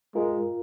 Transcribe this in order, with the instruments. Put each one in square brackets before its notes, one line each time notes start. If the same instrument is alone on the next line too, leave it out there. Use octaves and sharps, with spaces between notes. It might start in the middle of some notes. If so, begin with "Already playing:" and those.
[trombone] G#3 [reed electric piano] F4 A#4